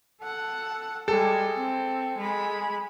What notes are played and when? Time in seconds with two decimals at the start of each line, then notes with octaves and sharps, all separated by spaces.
0.22 A4 F#5
1.08 G3 G#3 A4
1.56 C4
2.17 G#3 B5